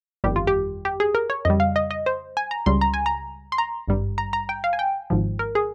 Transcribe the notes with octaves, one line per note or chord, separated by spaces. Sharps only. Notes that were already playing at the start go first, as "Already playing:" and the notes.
G1 F2 D#3 G3 G4
F4
G4
G4
G#4
A#4
C#5
F2 C#3 G3 D#5
F5
D#5
D#5
C5
G#5
A#5
C#2 C#3 G3 C6
A#5
G#5
A#5
C6
A#5
G#1 G2 G3
A#5
A#5
G5
F5
G#5
G5
G#1 G#2 F3
A#4
G#4